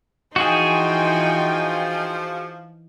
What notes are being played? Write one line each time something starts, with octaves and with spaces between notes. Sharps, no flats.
E3 F3 D#4 F#4 G#4 G5 G#5 C6